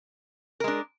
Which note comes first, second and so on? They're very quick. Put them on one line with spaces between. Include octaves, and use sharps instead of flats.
A#4 G#3 D4